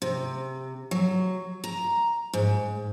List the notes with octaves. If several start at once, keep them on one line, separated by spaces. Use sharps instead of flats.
C3
F#3
A#5
G#2